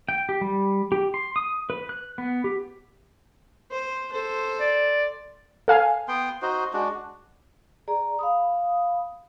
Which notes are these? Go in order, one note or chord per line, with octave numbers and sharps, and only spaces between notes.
G5
G4
G3
G4
C6
D#6
B4
F#6
B3
G4
C5
A4 C5
D5
A4 F5 G#5
B3 G5 C6
D#4 F#4 C5
G#3 D4 F#4
G#4 D5 A#5
F5 B5 D#6